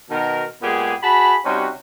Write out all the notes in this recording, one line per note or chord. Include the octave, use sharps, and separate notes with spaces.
B2 D#3 A#4
A#2 G#3 B3 G4 G#4
F#4 G#4 A5 B5
C3 G3 C#4 D#4 F#4